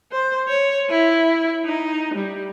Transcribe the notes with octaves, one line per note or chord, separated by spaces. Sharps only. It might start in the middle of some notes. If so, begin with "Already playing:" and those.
C5
C#5
E4
D#4
G3